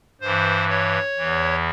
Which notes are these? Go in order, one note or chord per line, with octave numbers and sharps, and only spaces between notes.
G2 E3 C5
C#5
E2 E3